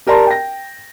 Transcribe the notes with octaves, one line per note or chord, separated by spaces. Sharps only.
G4 A#4 D5 A5 A#5 C6
G5 A#6